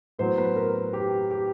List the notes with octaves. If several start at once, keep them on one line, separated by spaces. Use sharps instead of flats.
A2 F#3 B3 C5
B4
A#4
G4
G4